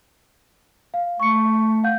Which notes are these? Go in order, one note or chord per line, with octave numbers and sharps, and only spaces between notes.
F5
A3 C#6 C#7
F5 F#5 G6